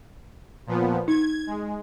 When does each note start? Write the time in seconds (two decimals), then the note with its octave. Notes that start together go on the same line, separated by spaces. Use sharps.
0.67 A#2 F3 B3
1.08 D#4 G#6
1.47 G#3